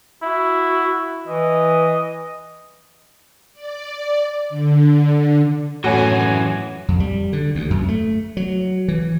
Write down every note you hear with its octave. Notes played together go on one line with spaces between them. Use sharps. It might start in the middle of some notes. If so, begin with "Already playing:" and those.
E4 F#4
E3 D#5
D5
D3
F#2 A2 E3 F#4 C#5 G#5
F2
G3
D3
D2
F#2
A3
F#3
E3